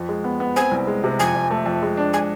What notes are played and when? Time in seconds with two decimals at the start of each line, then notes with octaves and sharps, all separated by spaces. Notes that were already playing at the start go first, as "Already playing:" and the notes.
Already playing: F2
0.09 G#3
0.24 B3
0.40 B3
0.56 C4 G#5
0.71 C2
0.87 G#3
1.04 C3
1.19 F2 G#5
1.34 F2
1.51 A3
1.66 F2
1.82 G#3
1.97 D4
2.14 G#3 G#5